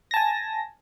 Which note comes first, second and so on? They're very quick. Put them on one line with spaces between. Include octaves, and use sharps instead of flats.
A#6 A5 G#5